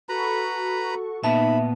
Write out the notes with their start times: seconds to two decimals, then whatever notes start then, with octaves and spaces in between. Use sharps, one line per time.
0.09 F#4 A4 B4 A#5 B5 C#6
1.24 A#2 B3 D#4 E5 A5 B5